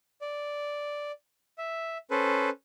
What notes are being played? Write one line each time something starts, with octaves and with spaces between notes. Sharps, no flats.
D5
E5
C#4 A4 B4 C5